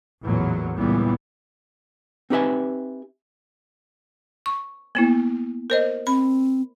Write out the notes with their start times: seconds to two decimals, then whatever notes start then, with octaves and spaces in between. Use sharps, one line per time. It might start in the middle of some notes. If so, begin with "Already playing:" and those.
0.24 A1 E2 A#2 E3 F#3
0.75 C#2 A#2 E3 G3 B3
2.30 C4 D#4 G4 B4 E5 G#5
4.46 C#6
4.95 A#3 B3 E4
5.70 A#4 C5 D#5
6.07 C4 B5